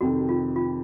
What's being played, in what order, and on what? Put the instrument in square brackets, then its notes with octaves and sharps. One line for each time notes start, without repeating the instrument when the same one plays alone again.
[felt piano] F2 C3 D#3 [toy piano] F#4
[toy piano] F4
F4